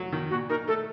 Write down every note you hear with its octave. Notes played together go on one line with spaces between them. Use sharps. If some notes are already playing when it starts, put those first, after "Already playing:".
Already playing: F#3 A3
D#3
A#2 F#4
D#4 A#4
A3 A4